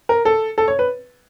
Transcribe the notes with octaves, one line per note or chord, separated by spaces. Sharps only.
A#4
A4
A4
C#5
B4